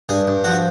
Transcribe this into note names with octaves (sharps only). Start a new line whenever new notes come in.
G2 G#4
G2
F3 F#4